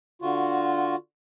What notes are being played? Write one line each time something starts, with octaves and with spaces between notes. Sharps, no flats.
D3 F4 F#4